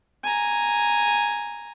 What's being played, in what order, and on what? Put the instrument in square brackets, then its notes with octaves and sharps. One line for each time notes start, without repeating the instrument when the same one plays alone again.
[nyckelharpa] G#5 A#5